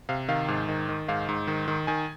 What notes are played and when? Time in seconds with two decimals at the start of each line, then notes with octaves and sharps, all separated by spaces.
0.09 C3 F5
0.28 D#3 F5
0.48 G#2
0.68 D#3
0.89 D#3
1.08 G#2 F5
1.29 G#2
1.47 D#3
1.68 D#3
1.87 D#3 G#5